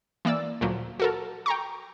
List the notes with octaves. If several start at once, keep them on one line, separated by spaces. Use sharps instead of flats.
E3 A#3 D5 E6
D2 A#2 F3 F#3
F#4 A4 A#4
G5 A#5 C#6